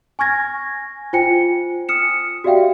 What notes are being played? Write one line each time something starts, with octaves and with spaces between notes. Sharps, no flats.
G#5 C#6 F6 G#6 A#6
F4 C5 G5 G#5 C#7
D#6 F6 C#7 E7
F#4 G4 D5 E5 F5 G5